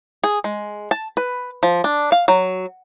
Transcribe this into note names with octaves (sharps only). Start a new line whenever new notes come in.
G#4
G#3
A5
B4
F3
D4
F5
F#3